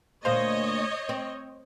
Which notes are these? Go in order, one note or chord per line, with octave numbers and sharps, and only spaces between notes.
D2 A#2 C5 C#5 D#5 F5
C4